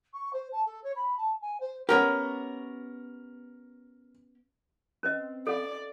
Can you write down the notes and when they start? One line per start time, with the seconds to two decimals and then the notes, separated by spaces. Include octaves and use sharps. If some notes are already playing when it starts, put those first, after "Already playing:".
0.13 C#6
0.33 C5
0.52 A5
0.66 A4
0.83 C#5
0.96 B5
1.17 A5
1.41 G#5
1.60 C5
1.89 B3 C#4 G4 A#4
5.03 C4 C#4 B4 D#5
5.47 A4 D5 F5